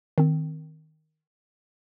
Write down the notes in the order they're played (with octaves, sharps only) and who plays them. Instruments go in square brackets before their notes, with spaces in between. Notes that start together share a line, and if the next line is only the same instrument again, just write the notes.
[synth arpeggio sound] D#3 C4